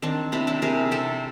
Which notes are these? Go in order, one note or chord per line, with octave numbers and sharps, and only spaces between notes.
D#3 C4 D4
C3 D4 E4
D4 E4
C3 G#4 A#4
C3 G4 A4